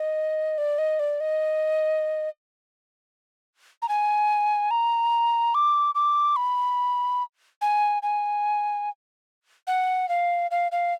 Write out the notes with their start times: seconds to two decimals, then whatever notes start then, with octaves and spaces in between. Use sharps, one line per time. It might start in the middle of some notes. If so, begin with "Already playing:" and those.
Already playing: D#5
0.58 D5
0.78 D#5
0.99 D5
1.20 D#5
3.82 A#5
3.89 G#5
4.71 A#5
5.54 D6
5.95 D6
6.36 B5
7.61 G#5
8.02 G#5
9.67 F#5
10.09 F5
10.51 F5
10.72 F5